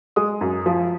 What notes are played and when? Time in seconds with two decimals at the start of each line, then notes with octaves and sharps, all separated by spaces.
0.16 G#3 D#6
0.41 F#2
0.66 F3